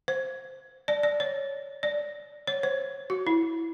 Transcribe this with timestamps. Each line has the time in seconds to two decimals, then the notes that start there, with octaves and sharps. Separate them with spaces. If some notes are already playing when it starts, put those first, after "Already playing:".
0.08 C5
0.88 D5
1.03 D5
1.20 C#5
1.83 D5
2.47 C#5
2.63 C5
3.10 F#4
3.27 E4